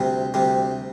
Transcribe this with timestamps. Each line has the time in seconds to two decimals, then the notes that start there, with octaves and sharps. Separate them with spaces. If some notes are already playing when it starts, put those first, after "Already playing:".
Already playing: D2 C3 G3
0.34 D2 C3 G3